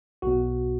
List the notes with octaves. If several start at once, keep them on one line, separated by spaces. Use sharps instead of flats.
B1 B2 F#4